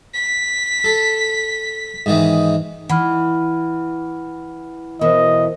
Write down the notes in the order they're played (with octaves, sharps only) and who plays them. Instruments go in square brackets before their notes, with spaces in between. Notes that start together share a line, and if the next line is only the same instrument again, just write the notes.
[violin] B6
[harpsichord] A4
G#2 D#3 E3
[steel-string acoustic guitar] E3 [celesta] F#5 B5 F6
[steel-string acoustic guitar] E2 B2 E3 [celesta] A#4 C5 [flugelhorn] D#5